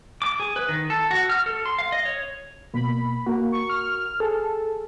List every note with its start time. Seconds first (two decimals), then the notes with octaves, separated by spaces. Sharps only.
0.22 D6
0.40 G#4
0.56 B4
0.69 D#3
0.90 A4
1.11 F#4
1.30 F6
1.46 A4
1.66 C6
1.79 F5
1.92 D#5
2.05 C#5
2.74 B2 A#3 B5
3.26 A#3 F#4 A#4
3.52 C#6
3.70 F6
4.20 G#4 A4